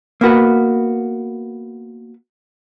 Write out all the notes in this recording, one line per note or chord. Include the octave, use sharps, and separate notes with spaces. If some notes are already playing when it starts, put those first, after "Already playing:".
A#3 B3 F#4 B4